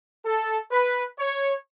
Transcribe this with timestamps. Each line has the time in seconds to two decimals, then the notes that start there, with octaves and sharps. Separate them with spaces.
0.24 A4
0.70 B4
1.18 C#5